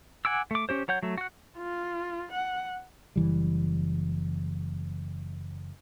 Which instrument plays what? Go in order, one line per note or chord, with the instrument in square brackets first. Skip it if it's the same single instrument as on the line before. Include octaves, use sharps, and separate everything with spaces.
[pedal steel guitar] F#5 G#5 D6 E6
A3 D6
C#4 G4 C5
F#3 C#5 F#5 G6
F#3 A3
F#4 F#5
[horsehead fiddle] F4
F#5
[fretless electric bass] F#1 E3 G3